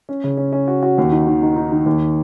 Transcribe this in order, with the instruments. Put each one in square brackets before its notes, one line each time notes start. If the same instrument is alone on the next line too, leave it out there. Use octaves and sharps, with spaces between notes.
[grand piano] C#4
C#3
C#4
C#4
F#4
F#4
D#2
D#4
D#3
D#3
D#4
D#3
D#2